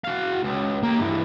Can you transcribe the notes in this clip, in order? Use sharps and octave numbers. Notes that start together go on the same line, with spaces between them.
F#4 F5
C#2
A#3 G4
G2 E3